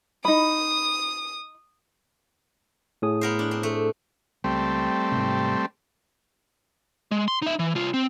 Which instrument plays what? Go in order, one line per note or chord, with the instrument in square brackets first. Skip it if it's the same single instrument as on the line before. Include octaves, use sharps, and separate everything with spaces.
[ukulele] D#4 B5 [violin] D#6
[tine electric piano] A2 G#4 D#6
[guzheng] B3 A#4 C5
D4
C4
A3
[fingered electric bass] C#2 [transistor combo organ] G3 A3 C4
[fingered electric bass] G#2 C3
[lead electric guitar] G#3
C6
D#4 E5
E3
C2 F4
C4